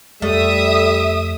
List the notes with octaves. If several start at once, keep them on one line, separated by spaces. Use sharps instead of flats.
F2 G3 A3 E5 D#6